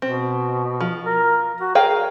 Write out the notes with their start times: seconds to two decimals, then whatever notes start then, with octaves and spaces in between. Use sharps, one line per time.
0.02 B2 C4
0.81 F3
1.04 A#4
1.60 F#4
1.75 G#4 A#4 F5 G5